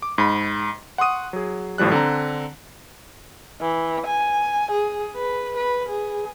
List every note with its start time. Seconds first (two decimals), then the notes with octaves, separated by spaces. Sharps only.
0.02 D6
0.18 G#2 B5
0.98 F#5 C6 C#6 D#6 D#7
1.33 F#3 G#4
1.78 G#1 A2 F3 G3 F#6
1.92 D3 C4 A#5
3.61 E3
4.06 G#5
4.71 G#4
5.16 B4
5.57 B4
5.88 G#4